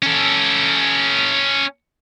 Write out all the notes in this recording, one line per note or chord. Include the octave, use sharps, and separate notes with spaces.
C#4 A4